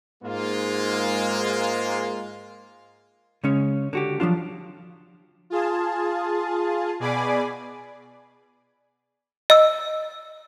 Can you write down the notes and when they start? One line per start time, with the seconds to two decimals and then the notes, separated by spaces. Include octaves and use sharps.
0.23 G#2 G#3 A#3 F4
3.44 C#3 G#3 C#4 C#5
3.93 D3 F#4 G4
4.20 F3 F#3 D4 F4
5.50 F4 G#4 A5
7.00 B2 G#4 D5 G#5 B5 D6
9.50 D#5 E6